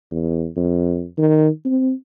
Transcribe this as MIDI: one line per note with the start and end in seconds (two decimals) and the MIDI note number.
0.11 0.48 40
0.57 1.05 41
1.18 1.48 51
1.65 1.92 60